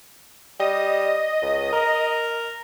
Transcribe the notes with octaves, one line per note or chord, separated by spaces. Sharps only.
G3 D#5
C#2
A#4